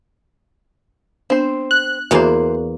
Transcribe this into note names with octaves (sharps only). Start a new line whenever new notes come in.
B3 C4 D4 C5
F#6
E2 E3 A#3 F#4 C5